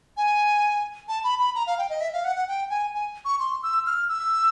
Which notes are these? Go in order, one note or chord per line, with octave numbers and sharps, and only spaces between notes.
G#5
A5
B5
B5
A#5
F5
G5
D#5
E5
F5
F#5
F#5
G5
G#5
G#5
C#6
C6
E6
F6
E6